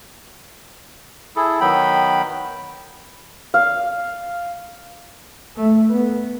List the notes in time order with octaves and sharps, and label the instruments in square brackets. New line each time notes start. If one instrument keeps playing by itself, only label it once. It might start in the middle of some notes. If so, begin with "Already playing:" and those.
[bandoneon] E4 G#4 A4
D#3 F#3 B3 G5 B5
[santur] F5
[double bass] A3
B3